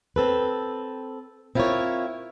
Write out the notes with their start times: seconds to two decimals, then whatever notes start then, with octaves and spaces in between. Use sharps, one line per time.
0.16 C4 A4 B4
1.55 C4 E4 F4 A4 A#4 C#5